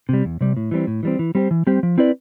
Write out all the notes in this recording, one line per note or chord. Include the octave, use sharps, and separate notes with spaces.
C3 G3
E2
C3 G3
A2
E3 G3 C4
A2
E3 G3 C4
E3
G3 C4 G4 C5
E3
G3 C4 G4 C5
F3
C4 E4 B4 D5